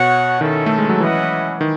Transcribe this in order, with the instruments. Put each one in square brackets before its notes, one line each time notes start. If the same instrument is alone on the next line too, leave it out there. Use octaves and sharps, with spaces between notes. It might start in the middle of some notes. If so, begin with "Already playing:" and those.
Already playing: [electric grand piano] B2 [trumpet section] F#4 C#5 F#5
[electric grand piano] D#3 [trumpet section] C#4 E4 A4
[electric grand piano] A3
G#3
F#3
[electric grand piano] E3 [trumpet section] C#4 E4 B4 D#5 F#5
[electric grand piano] D#3